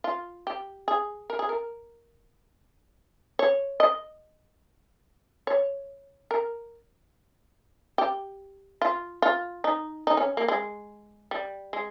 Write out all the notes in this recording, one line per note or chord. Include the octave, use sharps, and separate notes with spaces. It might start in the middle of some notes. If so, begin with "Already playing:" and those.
F4
G4
G#4
A#4
G#4
A#4
C#5
D#5
C#5
A#4
G4
F4
F4
D#4
D#4
C#4
A#3
G#3
G3
G#3